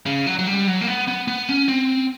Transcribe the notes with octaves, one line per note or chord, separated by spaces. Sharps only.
C#3
F#3
F#3
G3
F#3
A#3
B3
B3
B3
C#4
C4